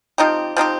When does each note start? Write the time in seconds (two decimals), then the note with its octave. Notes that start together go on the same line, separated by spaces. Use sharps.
0.18 F3 C4 D#4 G4
0.57 F3 C4 D#4 G4